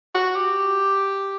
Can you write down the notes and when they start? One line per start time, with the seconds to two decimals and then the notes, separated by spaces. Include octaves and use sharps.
0.15 F#4
0.36 G4